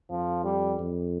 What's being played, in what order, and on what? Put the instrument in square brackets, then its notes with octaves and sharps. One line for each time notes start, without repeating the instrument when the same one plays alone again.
[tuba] F2 [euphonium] F3
[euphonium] G3
[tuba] F2